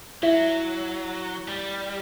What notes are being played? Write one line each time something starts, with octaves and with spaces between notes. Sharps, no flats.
F#3 E4
G3